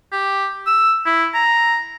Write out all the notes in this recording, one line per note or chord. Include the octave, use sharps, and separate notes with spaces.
G4
E6
E4
A#5